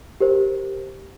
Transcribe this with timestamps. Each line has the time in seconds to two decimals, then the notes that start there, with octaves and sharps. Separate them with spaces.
0.20 G4 A#4 C5